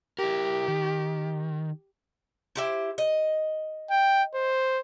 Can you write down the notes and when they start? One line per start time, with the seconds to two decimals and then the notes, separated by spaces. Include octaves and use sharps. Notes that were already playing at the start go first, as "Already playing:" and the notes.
0.19 E4 G4 A#4
0.68 D#3
2.55 E4 G4 C5
2.98 D#5
3.90 G5
4.35 C5